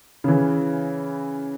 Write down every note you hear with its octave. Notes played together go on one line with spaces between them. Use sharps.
C#3 E3